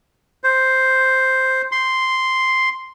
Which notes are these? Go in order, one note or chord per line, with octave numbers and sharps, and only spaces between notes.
C5
C6